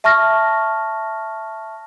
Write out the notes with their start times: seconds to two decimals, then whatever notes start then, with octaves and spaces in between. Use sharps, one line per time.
0.04 E5 A5 C#6 F6 A#6